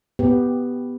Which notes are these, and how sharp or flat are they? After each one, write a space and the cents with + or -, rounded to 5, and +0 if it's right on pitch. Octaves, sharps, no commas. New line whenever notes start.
B3 +0 G4 +0